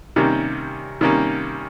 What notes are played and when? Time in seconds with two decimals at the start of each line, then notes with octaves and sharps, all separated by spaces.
0.16 C3 D#3 G3 A#3 C#4
1.01 C3 D#3 G3 A#3 C#4